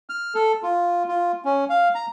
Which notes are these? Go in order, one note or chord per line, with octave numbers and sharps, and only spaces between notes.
F6
A4
F4
F4
C#4
F5
A#5